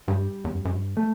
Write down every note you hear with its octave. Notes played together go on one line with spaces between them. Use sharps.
G2 G3
E2
F#2
F#2
G2
A3